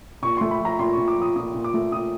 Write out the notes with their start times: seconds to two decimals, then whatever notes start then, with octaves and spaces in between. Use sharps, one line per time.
0.22 A#2 C#6
0.37 A3 C6
0.51 B5
0.60 F3 A#5
0.79 A#2 C6
0.93 A#2 C#6
1.08 D6
1.17 F3 D#6
1.36 A#2 D#6
1.54 A#2
1.64 D6
1.74 A3
1.92 A#2 D#6